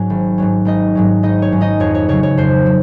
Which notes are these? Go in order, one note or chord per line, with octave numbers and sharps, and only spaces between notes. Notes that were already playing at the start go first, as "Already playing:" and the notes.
Already playing: G#2 F#3 C#4 F#4
G#1
G#2 F#3 C#4
G#1 D#4 D#5
G#2 F#3 C#4
G#1 D#4 D#5
C#5
G#2 F#3 C#4
D#4 D#5
F2 C#5
C#5
C#3 F#3 C#5
C#5
F2 C5
F#3